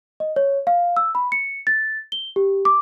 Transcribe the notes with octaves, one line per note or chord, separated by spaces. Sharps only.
D#5
C#5
F5
E6
B5
C#7
A6
G7
G4
D6